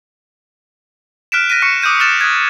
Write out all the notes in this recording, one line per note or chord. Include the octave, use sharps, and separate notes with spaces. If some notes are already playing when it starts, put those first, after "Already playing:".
F6 F#6 B6 D7 E7
F#6 A#6 B6 D#7
C#6 F6 C#7
D6 D#6 F#6 G6 D#7
F6 F#6 A6 E7
D#6 F#6 G#6